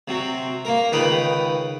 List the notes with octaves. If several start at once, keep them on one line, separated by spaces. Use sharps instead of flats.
C3 F#3 C4
A#3 A#4
C#2 D#3 B4 G5 B5 D#6